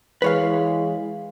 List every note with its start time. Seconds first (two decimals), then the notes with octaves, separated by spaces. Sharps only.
0.22 E3 G#3 B4 C#5 F5